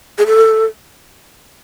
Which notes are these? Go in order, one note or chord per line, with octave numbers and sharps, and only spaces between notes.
G#4
A4